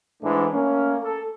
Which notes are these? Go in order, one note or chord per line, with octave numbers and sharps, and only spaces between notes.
G#2 E3 A3 D4
A3 A#3 C#4
A4